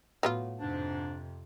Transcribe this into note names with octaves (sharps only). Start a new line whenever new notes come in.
A2 F#3 B3 F4
F2 G#2 C3 D4